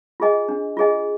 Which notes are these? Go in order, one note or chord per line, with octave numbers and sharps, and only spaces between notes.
F4 G#4 D#5 G#5
D4
F4 G#4 D#5 G#5